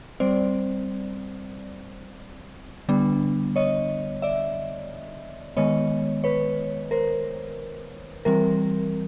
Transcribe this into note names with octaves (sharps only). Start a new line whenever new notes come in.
G3 C4 C5 D5
D3 G3 B3 D4
C#5 D#5
D5 E5
D#3 G#3 B3 C#5 D#5
B4 C#5
A#4 C5
E3 G3 C4 A#4